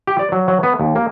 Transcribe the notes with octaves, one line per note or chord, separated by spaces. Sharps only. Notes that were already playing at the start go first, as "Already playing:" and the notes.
G4
D5
F#3
F#3
B3
D#2
A#3